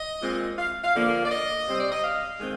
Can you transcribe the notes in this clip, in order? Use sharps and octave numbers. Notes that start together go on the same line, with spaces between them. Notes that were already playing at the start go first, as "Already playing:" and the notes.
Already playing: D#5
A#2 G#3 C4
F5
F5
D3 F3 A#3
F5
D5
D#5
C3 G3 C4 C5
D5
D#5
F5
D#3 G#3 C4